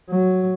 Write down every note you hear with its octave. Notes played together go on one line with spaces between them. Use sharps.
F#3